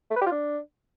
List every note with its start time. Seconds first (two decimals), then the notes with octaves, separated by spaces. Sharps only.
0.11 A3
0.16 B4
0.21 G4
0.26 F4
0.32 D4